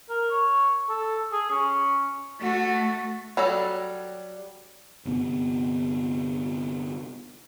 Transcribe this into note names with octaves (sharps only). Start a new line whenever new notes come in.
A#4
C#5
A4
G#4
C#4
A3 F#4
F#3 G3 A4
G1 C3 B3